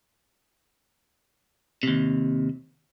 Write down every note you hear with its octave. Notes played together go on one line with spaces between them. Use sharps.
D#2 C3